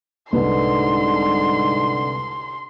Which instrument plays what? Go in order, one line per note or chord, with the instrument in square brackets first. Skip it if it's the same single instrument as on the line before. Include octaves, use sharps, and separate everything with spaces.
[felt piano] C2 B4 [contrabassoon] G#2 [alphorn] D3 [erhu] C6